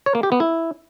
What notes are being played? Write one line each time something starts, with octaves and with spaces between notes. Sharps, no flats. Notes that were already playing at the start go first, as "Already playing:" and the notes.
C#5
A#3
G4
B3
E4